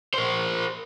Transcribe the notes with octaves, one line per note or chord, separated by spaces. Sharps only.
A#4 C5